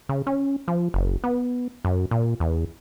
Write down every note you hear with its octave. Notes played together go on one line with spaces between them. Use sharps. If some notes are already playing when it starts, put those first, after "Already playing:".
C#3
C#4
F3
F#1
B3
F#2
A#2
E2